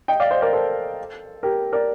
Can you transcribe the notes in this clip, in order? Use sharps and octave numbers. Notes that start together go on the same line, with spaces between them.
D#5 G5
D5 F5
C5 D#5
A#4 D5
A4 C5
G4 A#4
A#4 D5